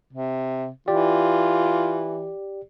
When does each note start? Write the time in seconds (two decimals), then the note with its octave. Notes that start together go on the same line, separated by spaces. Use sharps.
0.13 C3
0.88 E3 F4 G4 D5